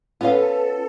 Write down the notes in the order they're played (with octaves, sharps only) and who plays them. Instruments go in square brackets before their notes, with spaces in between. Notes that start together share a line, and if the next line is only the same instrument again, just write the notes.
[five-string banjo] B3 F5 [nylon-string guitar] C#4 F4 [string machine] A4 [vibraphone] B4